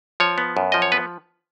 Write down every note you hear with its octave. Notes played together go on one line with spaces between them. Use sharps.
F3 C#5
B3
F#2
F3 D#5
C#5
B3 B4